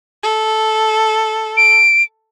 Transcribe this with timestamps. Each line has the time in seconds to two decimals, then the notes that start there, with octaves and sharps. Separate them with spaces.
0.23 A4
1.57 D7